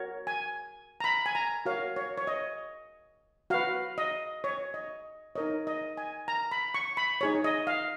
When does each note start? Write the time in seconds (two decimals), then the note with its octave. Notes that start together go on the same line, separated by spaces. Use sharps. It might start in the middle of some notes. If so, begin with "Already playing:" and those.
Already playing: F#4 A#4 C#5
0.27 G#5
1.00 A#5
1.04 B5
1.26 G#5
1.35 A#5
1.66 F#4 A#4 C#5 F5
1.96 C#5
2.18 C#5
2.27 D#5
3.50 F#4 B4 F5
3.98 D#5
4.44 C#5
4.74 D#5
5.36 D#4 A#4 C#5 D#5
5.67 D#5
5.97 G#5
6.28 A#5
6.52 B5
6.74 C#6
6.97 B5
7.21 D#4 G#4 C#5
7.44 D#5
7.67 F5